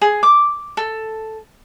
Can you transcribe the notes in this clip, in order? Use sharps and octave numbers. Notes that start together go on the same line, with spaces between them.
G#4
D6
A4